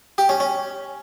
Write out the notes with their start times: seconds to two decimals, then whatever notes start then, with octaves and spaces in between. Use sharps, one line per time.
0.18 G4
0.29 C#4
0.40 C#4